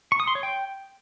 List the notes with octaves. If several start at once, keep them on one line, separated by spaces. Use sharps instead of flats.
C#6
D#6
C6
C#5
G5